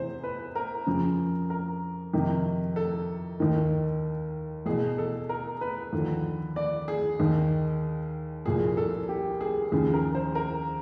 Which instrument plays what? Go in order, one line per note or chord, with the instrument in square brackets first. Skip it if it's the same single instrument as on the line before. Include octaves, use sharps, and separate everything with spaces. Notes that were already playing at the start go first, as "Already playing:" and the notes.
Already playing: [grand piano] E2 C3 E3 C5
B4
A#4
F2 C#3 F3
A#4
F2 C3 D#3
A4
D#2 D#3
E2 B2 G#4
A4
A#4
B4
D#2 D3 F3
D5
G#4
D#2 D#3
C2 A#2 F3 G#4
A4
G4
G#4
D#2 C#3 F3 G#4
A#4
C5
A#4